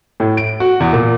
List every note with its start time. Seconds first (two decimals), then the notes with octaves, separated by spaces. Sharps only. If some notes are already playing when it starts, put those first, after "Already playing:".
0.20 A2
0.37 D7
0.60 F#4
0.80 E2
0.93 A#2